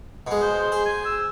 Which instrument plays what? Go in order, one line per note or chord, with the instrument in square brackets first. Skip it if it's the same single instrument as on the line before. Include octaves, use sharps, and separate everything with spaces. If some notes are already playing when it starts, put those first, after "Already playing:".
[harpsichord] B2 G#3
[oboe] C5
[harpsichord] G#4
[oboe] G#5
E6